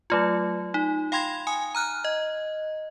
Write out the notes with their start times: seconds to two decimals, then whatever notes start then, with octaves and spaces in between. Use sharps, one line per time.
0.10 F#3 A3 F4
0.74 D#4
1.12 F5 G5 B5 C6 G#6 A#6
1.47 G#5 D#6
1.75 A#5 F6 F#6
2.04 D#5